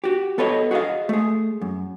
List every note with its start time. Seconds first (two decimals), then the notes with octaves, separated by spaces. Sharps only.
0.04 F#4 G4
0.38 B3 A4 B4 C#5 D#5
0.71 F#4 G#4 C#5 D#5 F5
1.09 A3 G#4
1.62 F#2